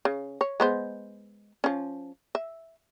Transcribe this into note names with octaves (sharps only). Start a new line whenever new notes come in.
C#3
C#5
G#3 B3 C5
F3 C#4
E5